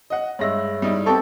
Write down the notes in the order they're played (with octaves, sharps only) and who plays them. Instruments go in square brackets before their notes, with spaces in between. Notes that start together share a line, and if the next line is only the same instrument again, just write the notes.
[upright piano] D#5 F#5
[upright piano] G2 G#3 A#6 [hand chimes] C#5 E5 E6
[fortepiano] G3 D#4 E4
[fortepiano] B3 C4 G4 [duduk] A4 [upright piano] C#6